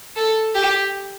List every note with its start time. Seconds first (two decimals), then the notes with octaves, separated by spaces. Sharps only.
0.16 A4
0.55 G4